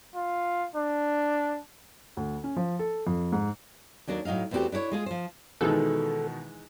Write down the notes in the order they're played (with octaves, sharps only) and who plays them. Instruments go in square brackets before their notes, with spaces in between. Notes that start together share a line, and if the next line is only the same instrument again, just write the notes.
[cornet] F4
D4
[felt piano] D2
C#4
F3
A4
F2
G#2
[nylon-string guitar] D#2 F#3 D4 A#4
A2 F#3 D#4 D#5 F5
E2 A3 C4 C#4 F#4 G4
D4 E4 A#4 C#5
G#3 F4 G#4
F3 C5
[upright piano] B2 D#3 [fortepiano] E3 G#3 D#4 [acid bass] A4